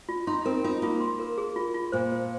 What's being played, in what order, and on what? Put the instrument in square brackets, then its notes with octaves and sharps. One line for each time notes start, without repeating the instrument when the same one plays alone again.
[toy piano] F4
[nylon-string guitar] D#4 [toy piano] C6
[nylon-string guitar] C4 [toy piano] A#4
[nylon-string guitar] D#4 [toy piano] F4
[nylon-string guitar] A#3 [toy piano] F4
[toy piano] C6
A#4
G#4
F4
F4
[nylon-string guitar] A#2 [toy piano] C5
[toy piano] C5